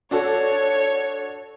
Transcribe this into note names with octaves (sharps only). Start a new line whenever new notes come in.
D4 F#4 A4 C#5